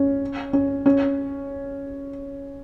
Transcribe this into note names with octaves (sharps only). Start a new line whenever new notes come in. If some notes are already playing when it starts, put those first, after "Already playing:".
Already playing: C#4
C#4
C#4